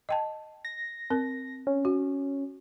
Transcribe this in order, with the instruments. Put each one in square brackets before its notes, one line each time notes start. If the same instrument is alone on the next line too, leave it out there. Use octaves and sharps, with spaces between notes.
[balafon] D#5 G5 A5
[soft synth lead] A#6
[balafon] C4 A#4
[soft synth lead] C#4
[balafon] F#4